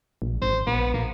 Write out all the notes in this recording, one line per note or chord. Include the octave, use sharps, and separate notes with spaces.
A#1
G#1 C5
A#1 B3
A#1 A#3